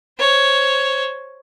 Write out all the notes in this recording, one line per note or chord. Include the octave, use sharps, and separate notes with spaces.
C5 C#5